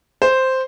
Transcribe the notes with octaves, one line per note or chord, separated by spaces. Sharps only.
C5